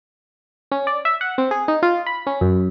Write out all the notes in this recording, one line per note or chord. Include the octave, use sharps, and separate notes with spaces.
C#4
D5
E5
F#5
C4
G#4
D#4
F4
B5
C#4
F#2